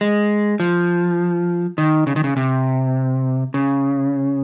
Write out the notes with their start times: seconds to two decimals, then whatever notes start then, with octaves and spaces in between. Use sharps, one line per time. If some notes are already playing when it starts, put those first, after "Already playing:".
0.01 G#3
0.60 F3
1.78 D#3
2.07 C#3
2.16 D#3
2.24 C#3
2.37 C3
3.54 C#3